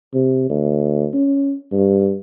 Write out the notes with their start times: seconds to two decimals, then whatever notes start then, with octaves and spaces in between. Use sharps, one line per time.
0.14 C3
0.50 D2
1.13 C#4
1.72 G2